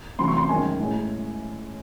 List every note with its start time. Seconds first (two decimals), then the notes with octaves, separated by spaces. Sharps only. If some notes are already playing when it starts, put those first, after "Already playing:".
0.18 E2 C3 F#3 A3 C6
0.28 C#6
0.37 C6
0.49 F#2 D#3 G#3 G#5
0.79 A2 G#3